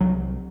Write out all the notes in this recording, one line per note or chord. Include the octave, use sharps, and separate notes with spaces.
C2 F#3